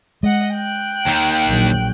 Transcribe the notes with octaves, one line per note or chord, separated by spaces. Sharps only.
G#3 D#5 F#5
G5 F#6
D#2 D#3
A#1 F#3